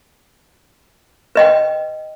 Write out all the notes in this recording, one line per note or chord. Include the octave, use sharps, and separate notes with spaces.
B4 D#5 G5